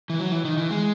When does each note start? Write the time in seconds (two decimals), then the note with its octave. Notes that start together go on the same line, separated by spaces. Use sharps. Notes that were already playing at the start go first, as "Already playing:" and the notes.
0.10 E3
0.19 F#3
0.32 E3
0.45 D#3
0.58 E3
0.71 G#3